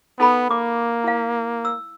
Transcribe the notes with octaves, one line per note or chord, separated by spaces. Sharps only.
B3 D#4 A4 B5
A#3 D6
E4 F5
E6